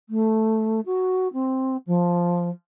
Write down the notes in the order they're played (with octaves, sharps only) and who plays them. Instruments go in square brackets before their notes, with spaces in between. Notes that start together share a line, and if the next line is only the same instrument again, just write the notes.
[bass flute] A3
F#4
C4
F3